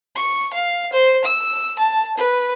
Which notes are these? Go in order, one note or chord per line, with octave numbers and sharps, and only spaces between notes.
C#6
F5
C5
E6
A5
B4